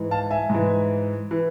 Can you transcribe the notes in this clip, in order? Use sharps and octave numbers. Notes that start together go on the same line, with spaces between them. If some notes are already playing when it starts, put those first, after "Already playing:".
Already playing: G#2 E3
F5 A5
E5 G#5
G#2 E3
E3